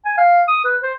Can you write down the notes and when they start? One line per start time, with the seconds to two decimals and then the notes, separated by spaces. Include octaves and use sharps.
0.05 G#5
0.18 F5
0.48 D#6
0.65 B4
0.83 C5